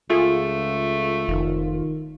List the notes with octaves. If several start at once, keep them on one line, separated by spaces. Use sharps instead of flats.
C#2 A3 F4 G#4
F1 D#3